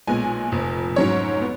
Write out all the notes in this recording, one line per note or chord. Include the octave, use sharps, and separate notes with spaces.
B1 A#2 G#3 B3 G#5
F1 F2 F3
G#2 F#3 C#4 C#5
B3